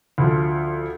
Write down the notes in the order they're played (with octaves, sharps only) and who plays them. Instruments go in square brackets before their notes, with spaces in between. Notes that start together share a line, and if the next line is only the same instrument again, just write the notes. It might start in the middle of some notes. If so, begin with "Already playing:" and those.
[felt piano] D2 F3